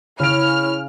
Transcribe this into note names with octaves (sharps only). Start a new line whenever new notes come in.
C#3 C#4 E4 C#5 B5 F6 D7